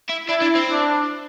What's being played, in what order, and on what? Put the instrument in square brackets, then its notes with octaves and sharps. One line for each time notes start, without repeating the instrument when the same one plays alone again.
[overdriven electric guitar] E4
[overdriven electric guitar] D4 [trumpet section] E4
[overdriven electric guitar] D4
C4
[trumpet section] D4